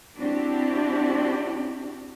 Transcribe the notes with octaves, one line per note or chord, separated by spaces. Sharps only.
C4 D4 E4 F#4 G4